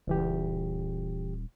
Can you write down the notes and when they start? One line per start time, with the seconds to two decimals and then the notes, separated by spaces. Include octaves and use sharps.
0.07 D#1 C#2 E3 G4